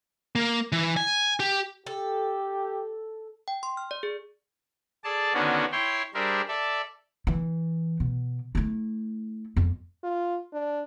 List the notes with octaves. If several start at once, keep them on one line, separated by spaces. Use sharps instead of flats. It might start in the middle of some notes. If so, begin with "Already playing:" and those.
A#3
E3
G#5
G4
G4 A4
G5
C6
F6
D5
G#4
G#4 A4 D5 A5
D3 D#3 B3 C#4 D4 F#4
E4 C#5 G5 C6
G3 D4 G#4 A#4 C5 E5
A4 D5 E5
E3
B2
A3 E4
F2
F4
D4